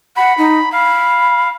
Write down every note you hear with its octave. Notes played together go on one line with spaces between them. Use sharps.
F#5 B5
D#4
F5 B5